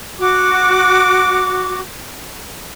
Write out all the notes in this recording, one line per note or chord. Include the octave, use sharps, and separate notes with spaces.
F#4 D6